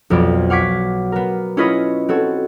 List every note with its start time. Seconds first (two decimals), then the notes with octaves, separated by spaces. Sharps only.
0.10 B1 F2 B3 D5
0.50 F5 F#5 C#6 D6 G#6 B6
1.12 B3 A#4
1.57 C#4 E4 F4 B4 C#5 D#5
2.09 C4 F#4 A4 C#5